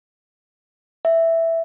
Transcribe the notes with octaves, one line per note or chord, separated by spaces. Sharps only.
E5